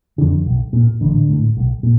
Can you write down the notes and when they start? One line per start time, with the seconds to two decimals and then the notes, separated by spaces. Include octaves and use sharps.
0.18 F2 D3
0.46 B1
0.73 A#2
1.01 A1 D3
1.29 A2
1.57 B1
1.83 A#2